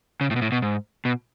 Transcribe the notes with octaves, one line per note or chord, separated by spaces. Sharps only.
C#3
A2
B2
A2
B2
G#2
B2